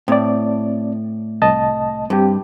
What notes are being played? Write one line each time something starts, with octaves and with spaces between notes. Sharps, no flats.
A2 C4 D5
C2 D#5 A5
G2 C4 G4